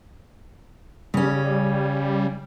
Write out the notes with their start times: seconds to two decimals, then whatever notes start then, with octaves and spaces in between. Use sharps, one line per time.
1.14 C#3 G3 C#4